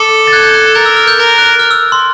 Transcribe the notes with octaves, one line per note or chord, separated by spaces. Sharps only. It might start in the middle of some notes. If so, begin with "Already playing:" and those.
Already playing: A4 D6
A6
F#6 G#6
G6 A6
F#6 G#6
A#4 G6 A6
E6
F6
G6
A#4 G6
F#6
F6
E6
C6